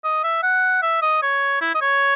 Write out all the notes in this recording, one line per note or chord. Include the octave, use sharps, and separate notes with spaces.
D#5
E5
F#5
E5
D#5
C#5
E4
D#5
C#5